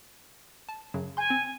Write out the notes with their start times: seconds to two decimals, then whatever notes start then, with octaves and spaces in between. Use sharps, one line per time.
0.69 A5
0.94 F#2 C#3 F#3
1.17 G#5 C6 G6
1.30 C4